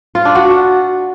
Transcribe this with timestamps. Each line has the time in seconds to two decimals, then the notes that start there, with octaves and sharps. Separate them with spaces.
0.15 F4
0.25 D4
0.35 F#4